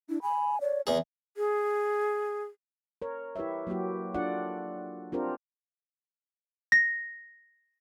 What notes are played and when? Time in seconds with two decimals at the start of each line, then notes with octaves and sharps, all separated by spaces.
0.09 D4 E4
0.22 G#5 B5
0.61 C#5 D5
0.87 E2 G#4 E5 G#5
1.37 G#4
3.02 A#4 C#5
3.36 E4 G4 B4 C#5 E5
3.67 F#3 A#3 E4 F#4 G4
4.14 D4 F4 A4 D5 F#5
5.12 C4 D4 F4 G4 A#4 C5
6.72 A#6